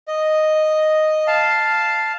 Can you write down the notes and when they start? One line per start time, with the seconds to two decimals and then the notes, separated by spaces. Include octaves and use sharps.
0.08 D#5
1.27 F5 A5